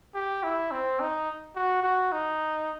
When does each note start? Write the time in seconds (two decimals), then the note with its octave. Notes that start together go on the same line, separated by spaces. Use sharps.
0.14 G4
0.43 E4
0.71 C4
1.00 D#4
1.55 F#4
1.83 F#4
2.12 D#4